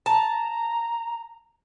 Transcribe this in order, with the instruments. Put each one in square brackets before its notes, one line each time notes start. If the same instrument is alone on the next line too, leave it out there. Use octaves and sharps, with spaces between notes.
[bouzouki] A5 [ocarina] A#5